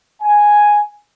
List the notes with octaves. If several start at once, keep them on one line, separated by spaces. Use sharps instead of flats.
G#5